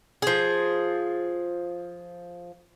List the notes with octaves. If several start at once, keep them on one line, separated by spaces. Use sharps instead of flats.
F3 G#4